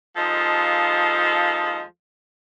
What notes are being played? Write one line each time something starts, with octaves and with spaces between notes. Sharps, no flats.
D#2 F3 G#3 A4 D#5 F5